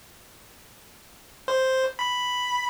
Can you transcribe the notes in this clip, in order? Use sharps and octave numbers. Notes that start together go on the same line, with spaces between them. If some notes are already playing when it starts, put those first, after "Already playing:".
C5
B5